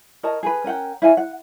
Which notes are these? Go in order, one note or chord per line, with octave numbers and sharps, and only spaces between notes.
A#4 C#5 D#5 A5
G#4 B4
C#4 A#4 F#5 G5
E4 C#5 F5 G#5
F#5